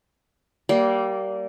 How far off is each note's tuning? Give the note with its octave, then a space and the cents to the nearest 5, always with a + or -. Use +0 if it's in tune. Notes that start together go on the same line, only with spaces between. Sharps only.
G3 -25 A#3 +0